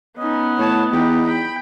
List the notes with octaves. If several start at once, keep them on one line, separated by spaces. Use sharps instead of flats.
B3 C#4 D#4 D#5
A2 C#5 A5
E2 D#4 G4
G5 B5